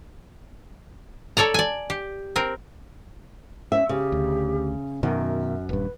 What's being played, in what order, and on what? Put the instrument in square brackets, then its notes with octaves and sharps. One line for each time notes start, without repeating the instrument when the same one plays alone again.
[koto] A4 C#5 D5 A#5
D5 G#5
G4
C4 A#4
[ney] C#4 [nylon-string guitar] E5
[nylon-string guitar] C#3 [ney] G4
[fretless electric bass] D2
[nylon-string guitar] F#2 [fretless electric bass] B2 D#3 [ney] E5
[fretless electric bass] D#1 G2 [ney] B4